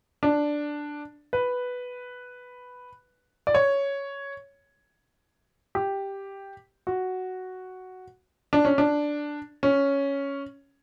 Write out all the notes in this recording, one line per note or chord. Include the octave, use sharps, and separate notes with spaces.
D4
B4
D5
C#5
G4
F#4
D4
C#4
D4
C#4